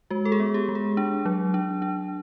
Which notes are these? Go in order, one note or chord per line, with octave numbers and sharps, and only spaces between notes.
G#3 F#4
A4
G#4
B3
G4
G#3
G#4
D4
F#3
D4
D4